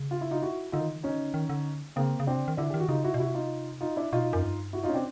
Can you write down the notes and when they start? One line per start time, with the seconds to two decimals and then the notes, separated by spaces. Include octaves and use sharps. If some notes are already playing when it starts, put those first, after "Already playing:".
Already playing: C#3
0.11 F4
0.21 E4
0.31 D#4 F4
0.42 E4 F#4
0.72 D3 D#4 F4
0.80 D#3
0.89 D3
0.96 D#3
1.03 D3 C#4 D#4
1.11 D#3
1.19 D3
1.34 D#3
1.50 D3
1.96 C#3 A#3 C4
2.20 C#3
2.27 C3 C4 D4
2.37 C#3
2.48 D#3
2.57 D3 D4 E4
2.70 D#3 G4
2.80 F#4
2.89 C#3 D#4 F4
3.04 E4 F#4
3.14 B2
3.20 C3 E4 F#4
3.34 D#4 F4
3.81 D#4 F4
3.96 D4 E4
4.13 B2 D#4 F4
4.33 F#2
4.43 G2
4.73 E4 F#4
4.83 D#4 F4
4.89 C#4
4.94 C4 D4